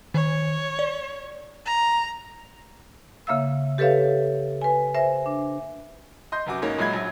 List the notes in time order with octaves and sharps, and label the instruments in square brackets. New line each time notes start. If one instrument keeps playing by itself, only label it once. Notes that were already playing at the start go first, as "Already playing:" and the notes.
[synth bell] D#3 [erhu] C#5
[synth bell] D5
[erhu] A#5
[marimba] C#3 A#3 E5 F5 E6
G4 A4 B4 C#5 E5 F5
B4 G#5
C5 E5 G#5 A#6
D4
[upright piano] D#5 C6 G6
F1 F#2 F#4 D6
G#2 A#3 C#4 D#4 C#5
A#2 F#3 G#3 E5 B5 G#6
A#1 F#3